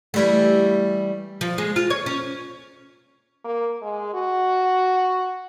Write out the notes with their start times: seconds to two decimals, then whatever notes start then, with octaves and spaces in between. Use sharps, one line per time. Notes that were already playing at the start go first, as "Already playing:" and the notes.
0.14 E3 G3 A3
1.41 F3
1.58 G#3
1.76 F4
1.90 C#5
2.06 C#4
3.44 A#3
3.82 G#3
4.14 F#4